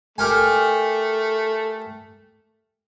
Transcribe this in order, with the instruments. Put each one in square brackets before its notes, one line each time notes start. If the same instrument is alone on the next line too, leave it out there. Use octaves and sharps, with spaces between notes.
[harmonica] A3 [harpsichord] G4 A#4 G#5